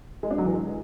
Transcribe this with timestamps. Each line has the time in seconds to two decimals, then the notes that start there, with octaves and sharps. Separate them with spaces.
0.23 G#3
0.31 D4
0.38 F#3
0.46 E3
0.53 G#3